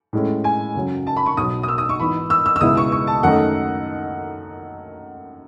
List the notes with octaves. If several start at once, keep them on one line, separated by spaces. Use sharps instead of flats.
A2 G#3 C#4
G#5
F#2 C#3 F#3 C#4
A5
B5
C#6
B1 B2 F#3 D#6
D#6
E6
D#6
C#6
G#2 E3 B3 B5
E6
E6
E6
C#2 B2 G#3 B3 E4 D#6
C#6
C#6
A5
F#2 D#3 A3 D#4 F#5